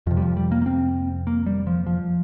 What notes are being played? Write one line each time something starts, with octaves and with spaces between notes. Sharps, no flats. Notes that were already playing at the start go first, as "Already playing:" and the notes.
F2 C3 F3
G3
F3
G3
A#3
A#3
C4
A#3
G3
F3
F3